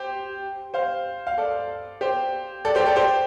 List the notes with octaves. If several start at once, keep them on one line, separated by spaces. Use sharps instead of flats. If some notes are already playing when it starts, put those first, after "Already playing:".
Already playing: G4 C5
C5 F5
F5
A4 D5
G4 C5
A4 D5
G4 C5
A4 D5
G4 C5